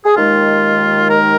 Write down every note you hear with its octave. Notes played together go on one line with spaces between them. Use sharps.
G#4
D#2 D#3 G#3 F4
A#4